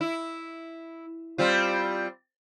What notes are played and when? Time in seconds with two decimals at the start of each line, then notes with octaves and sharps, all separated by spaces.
0.01 E4
1.38 G3 C4 F4